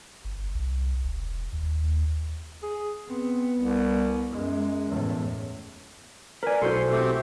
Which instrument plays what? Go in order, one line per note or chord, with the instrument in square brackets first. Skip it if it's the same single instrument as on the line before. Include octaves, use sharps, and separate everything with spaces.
[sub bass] G1
C2
E1
D#2
[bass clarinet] G#4
[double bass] B3 [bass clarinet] C4
[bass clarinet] C2
[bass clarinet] F#2 [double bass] G#3
[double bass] E2 A2
[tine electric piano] A#4 G#5 [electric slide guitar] B4 D5
[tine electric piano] B1 F#4 C5 [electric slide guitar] E4 A4 [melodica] C6
[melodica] A3 C4 G4